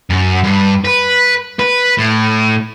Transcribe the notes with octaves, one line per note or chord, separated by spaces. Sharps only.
F#2
G2
B4
B4
A2